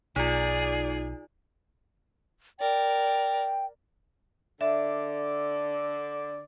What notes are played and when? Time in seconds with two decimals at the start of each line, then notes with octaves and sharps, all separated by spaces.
0.16 B1 D#4 F4 G#4 D5
2.60 A#4 D5 G5
4.61 D3 D5 E5